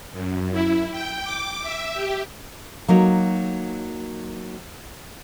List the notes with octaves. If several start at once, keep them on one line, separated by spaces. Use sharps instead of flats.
F#2
E4
G5
D6
E5
G4
F#3 A#3 D#4